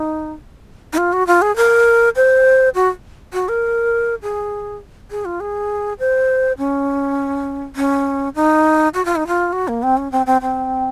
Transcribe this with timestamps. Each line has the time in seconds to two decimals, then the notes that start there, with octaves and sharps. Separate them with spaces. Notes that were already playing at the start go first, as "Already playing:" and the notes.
Already playing: D#4
0.93 D#4
0.98 F4
1.13 F#4
1.27 F4
1.42 G#4
1.56 A#4
2.16 C5
2.75 F#4
3.33 F#4
3.49 A#4
4.22 G#4
5.11 G#4
5.25 F4
5.40 G#4
5.99 C5
6.58 C#4
7.76 C#4
8.35 D#4
8.94 F#4
9.05 F4
9.16 D#4
9.27 F4
9.53 F#4
9.68 A#3
9.83 C4
9.97 C#4
10.12 C4
10.26 C4
10.42 C4